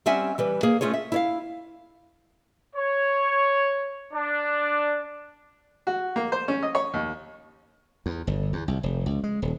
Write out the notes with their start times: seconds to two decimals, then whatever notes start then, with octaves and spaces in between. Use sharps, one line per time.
0.06 G3 C4 C#4 E5 F#5 G#5
0.38 E3 G3 B4
0.63 A#3 G#4
0.81 A3 C#4 F4 G#4 C#5
0.93 E5
1.12 E4 C#5 F5
2.76 C#5
4.13 D4
5.87 F#4
6.16 A#3
6.32 C5
6.48 C#4
6.63 D#5
6.75 C#5
6.94 D#2
8.06 E2
8.27 G1
8.53 E2
8.68 C2
8.83 F1
9.06 C#2
9.24 G#3
9.42 D#1